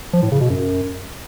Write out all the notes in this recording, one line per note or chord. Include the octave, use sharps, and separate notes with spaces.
F3
A2
C#3
B2
F#2